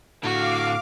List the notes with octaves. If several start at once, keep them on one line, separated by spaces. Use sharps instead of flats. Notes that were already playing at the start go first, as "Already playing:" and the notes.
A2 D3 F#4 F5 D6